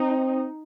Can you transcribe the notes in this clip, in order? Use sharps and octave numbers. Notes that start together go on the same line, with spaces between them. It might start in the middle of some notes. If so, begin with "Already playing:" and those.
Already playing: C4 D#4